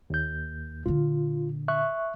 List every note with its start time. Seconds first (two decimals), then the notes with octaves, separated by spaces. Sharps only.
0.10 D#2 G6
0.86 A#2 D3 F4
1.68 E5 C#6 F#6